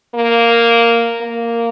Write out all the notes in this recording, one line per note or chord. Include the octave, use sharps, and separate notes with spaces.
A#3
A#3